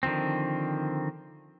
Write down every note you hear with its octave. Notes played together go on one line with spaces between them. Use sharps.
D3 D#3 F3 C4